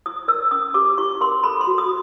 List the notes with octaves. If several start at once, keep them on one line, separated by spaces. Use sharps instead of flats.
E4 D#6
A#4 E6
C#4 D#6
G4 D6
E4 C#6
A#4 C6
A4 B5
C6
F#4
D#6